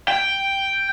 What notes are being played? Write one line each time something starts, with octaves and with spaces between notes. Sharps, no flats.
G5